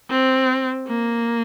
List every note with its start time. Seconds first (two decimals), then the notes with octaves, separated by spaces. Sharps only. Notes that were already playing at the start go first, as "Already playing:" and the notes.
0.10 C4
0.88 A#3